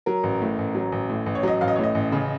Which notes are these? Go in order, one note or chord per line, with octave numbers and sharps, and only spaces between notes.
F#3 A#4
A1
A2
A1
F#3
A1
A2
A1
C#5
F#3 D#5
A1 F5
D#5
C#5
A2 D#5
A1
C#3